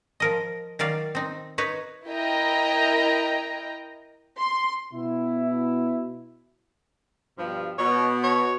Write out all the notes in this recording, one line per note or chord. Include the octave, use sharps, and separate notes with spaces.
F3 A#4 D#5
D#3 F#3 D5 F5
C4 D#4
D#4 B4 C#5
E4 A#4 D#5 G5 A#5
C6
B2 E4
G2 B2 F3
B2 C#5
C#5